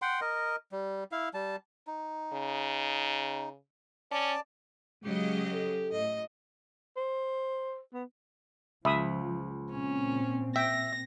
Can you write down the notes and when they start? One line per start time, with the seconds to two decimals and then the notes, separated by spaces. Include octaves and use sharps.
0.02 F#5 G5 C6
0.21 A#4 D#5
0.72 G3
1.12 E4 F5
1.34 G3 A5
1.87 D#4
2.33 C#3
4.11 C#4 D5 A5
5.04 C#3 F#3 G#3 G4 D#5
5.53 A4
5.92 A2 D#5
6.97 C5
7.94 B3
8.85 C#2 F3 E5 B5 D#6
9.71 A#2 C4 C#4
10.56 E5 G5 A#6